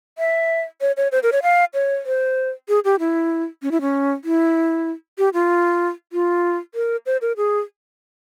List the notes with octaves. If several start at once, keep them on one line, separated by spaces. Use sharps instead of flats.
E5
C#5
C#5
C5
A#4
C#5
F5
C#5
C5
G#4
G4
E4
C#4
E4
C#4
E4
G4
F4
F4
A#4
C5
A#4
G#4